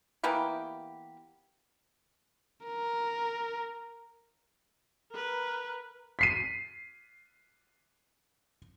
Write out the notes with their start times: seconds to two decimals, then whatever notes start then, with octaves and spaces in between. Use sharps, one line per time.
0.24 E3 A#3 B3 G4
2.66 A#4
5.11 A#4 B4
6.19 B6 C7 D#7